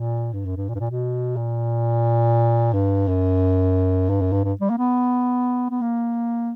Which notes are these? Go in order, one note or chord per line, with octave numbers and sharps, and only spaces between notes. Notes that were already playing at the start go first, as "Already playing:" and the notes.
Already playing: A#2
G2
F#2
G2
A#2
G2
A#2
B2
A#2
G2
F#2
G2
F#2
G2
G2
G3
A#3
B3
B3
A#3